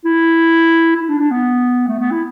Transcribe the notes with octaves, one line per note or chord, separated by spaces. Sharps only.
E4
E4
D4
D4
B3
A3
B3
E4